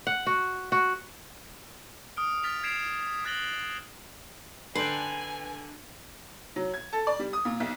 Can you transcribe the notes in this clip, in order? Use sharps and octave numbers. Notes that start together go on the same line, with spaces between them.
F#5
F#4
F#4
D#6 F6 D7
F6 A6 B6 F7
G#6 B6 C7 D7 E7 F7
D#6 F#6 A6 A#6 F#7 G7
D3 B4 G5 G#5 C6
F#3
G#6
A4
D5
G3
D#6
A#2
B1